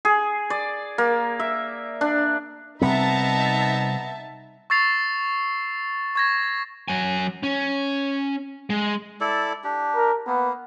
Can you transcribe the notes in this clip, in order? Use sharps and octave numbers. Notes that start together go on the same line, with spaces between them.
G#4
D5
A#3
E5
D4
C3 G3 B3 C4 D#4 E5 A5 A#5
C#6 E6 A6 C7 F7
C#6 G#6 A#6
F#3 G#5
C#4
G#3
E4 A4 D5
D4 G4
A#4
A#3 B3